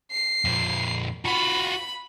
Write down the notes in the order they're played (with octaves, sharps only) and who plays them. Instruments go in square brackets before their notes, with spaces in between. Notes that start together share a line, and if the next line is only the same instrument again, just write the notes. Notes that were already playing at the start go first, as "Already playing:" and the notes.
[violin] C7
[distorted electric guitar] F2 A#2
[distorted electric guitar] F4 F#4 [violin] B5